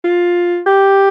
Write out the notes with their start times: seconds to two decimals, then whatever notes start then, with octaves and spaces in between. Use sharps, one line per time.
0.04 F4
0.66 G4